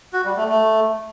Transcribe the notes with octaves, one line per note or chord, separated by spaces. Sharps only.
F#4
G3
A3
A3